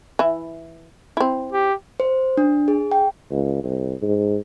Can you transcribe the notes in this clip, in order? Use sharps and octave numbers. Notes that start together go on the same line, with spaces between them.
E3 E4
C4 E4
G4
C5
D4
G#4
G5
C#2
C2
G#2